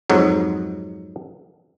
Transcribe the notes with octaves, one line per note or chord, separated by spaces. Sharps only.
F2 G#2 F#3